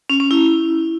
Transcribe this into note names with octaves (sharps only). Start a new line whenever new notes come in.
C#4
C#4
E4